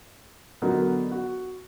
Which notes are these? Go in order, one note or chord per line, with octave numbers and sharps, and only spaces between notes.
D3 F#3 B3 D#4 F#4 A#4
F#4